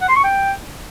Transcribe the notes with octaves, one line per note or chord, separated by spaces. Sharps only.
F#5
C6
C#6
G5